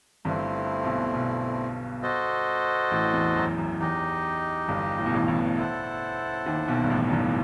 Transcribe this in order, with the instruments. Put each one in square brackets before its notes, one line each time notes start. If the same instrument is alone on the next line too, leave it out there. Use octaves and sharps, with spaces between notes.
[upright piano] G1 G2 [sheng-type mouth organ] A3 C4 E4
[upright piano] B1 B2
B1 B2
[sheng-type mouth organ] F#4 A4 C5 D#5
[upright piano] A1 A2
E2
F#2
F#2
[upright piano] E2 [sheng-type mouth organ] D#4 G4 D#5
[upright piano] G1 G2
A2
B2
A1 A2
A1 A2
[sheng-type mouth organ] E4 A4 C5 F#5 A5
[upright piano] D#2 D#3
B1 B2
G2
A1 A2
F#2
G1 G2